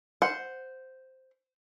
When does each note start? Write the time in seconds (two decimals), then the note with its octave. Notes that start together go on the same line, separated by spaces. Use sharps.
0.22 C5 F#5